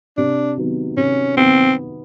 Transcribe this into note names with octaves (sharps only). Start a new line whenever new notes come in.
C3 D4
D#3 F#3 B3
C3 C#4
D#3 F#3 B3 C4